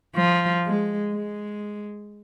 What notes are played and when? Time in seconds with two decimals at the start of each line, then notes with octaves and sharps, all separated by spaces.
0.16 F3
0.66 G#3
1.15 G#3